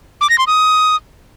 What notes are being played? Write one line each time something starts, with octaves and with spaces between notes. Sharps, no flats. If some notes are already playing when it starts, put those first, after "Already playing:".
D6
A#6
C6
D#6